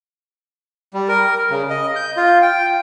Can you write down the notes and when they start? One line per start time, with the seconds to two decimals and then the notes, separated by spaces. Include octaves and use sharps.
0.94 G3
1.09 A#4
1.50 C#3
1.70 D#5
1.96 G6
2.17 F4
2.42 G5